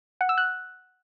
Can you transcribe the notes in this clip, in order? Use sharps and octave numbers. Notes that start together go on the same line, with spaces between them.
F#5
E6
F#6